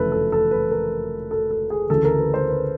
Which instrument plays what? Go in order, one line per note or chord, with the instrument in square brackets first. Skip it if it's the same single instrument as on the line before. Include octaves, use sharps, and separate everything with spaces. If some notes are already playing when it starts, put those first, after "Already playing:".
Already playing: [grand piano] F1 E2 C#3 E3 A4 B4
A4
A4
B4
A#4
A4
A4
G#4
D2 C#3 E3 A4
A#4
B4
C5
B4